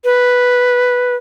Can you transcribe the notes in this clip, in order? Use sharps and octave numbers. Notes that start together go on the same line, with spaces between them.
B4